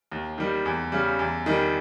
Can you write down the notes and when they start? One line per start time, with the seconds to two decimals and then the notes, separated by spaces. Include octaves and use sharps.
0.12 D#2
0.38 D#3 G3
0.66 E2
0.92 C#3 G3
1.19 E2
1.46 D#3 G3